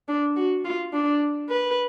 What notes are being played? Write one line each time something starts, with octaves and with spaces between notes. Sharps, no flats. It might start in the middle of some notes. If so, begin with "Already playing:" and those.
D4
F#4
F4
D4
B4